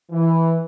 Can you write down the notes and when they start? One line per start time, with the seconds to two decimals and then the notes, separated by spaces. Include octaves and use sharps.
0.11 E3